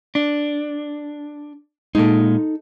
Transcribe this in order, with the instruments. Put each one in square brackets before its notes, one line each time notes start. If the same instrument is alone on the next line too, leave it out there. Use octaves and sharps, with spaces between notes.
[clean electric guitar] D4
[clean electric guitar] A#2 G#3 [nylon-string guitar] D#4 A4